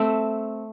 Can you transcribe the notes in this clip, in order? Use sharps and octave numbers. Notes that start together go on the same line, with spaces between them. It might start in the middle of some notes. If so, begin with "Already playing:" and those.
Already playing: A3 C4